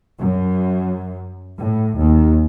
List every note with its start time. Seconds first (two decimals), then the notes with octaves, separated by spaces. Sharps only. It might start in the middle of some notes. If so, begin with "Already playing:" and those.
0.18 F#2
1.58 A2
1.97 D#2